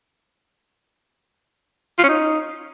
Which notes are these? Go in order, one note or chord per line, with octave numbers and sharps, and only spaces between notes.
F4
C#4
D#4